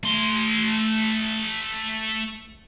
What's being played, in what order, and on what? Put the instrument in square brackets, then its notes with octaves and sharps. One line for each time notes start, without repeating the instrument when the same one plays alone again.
[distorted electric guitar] A3 C6